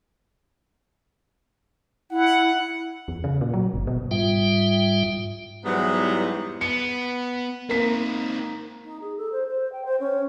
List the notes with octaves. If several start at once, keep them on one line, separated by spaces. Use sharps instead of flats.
E4 F#5
E2
C#3
A#2
F#3
G1
B2
G#2 G3 F4 E5 G5
E2 G#2 E3 F#3 G3 B3
B3 C#7
A#3 C4 D#4 B6
D#4
G#4
A4
C5
C5
G5
C5
C#4